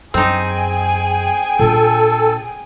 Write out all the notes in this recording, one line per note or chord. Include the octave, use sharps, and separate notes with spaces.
F#2 C4 D#4 G#4 G5 G#5
A#2 D4 A4